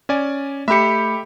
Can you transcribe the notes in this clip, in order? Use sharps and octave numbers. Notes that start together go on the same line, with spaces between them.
C#4 D5 G#5
A3 G4 E5 B5 C#7